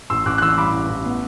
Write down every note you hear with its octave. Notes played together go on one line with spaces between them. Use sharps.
A1 C6 E6
A1 D6 F#6
F#6
E3 C6 E6
G2 B5 D6
A1
A1
B3